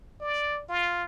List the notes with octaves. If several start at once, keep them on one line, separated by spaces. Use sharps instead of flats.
D5
F4